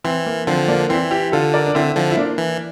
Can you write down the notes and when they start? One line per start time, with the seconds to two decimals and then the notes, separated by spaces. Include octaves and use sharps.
0.04 E3 C4
0.26 A#3
0.47 D3 F3 C4
0.68 A#3 D4
0.89 E3 C4 E4
1.11 E4 G4
1.32 D3 F4 A4
1.54 A#4 D5
1.66 D4
1.75 D3 C4 E4
1.96 D3 F3
2.11 E4
2.17 A#3 D4
2.38 E3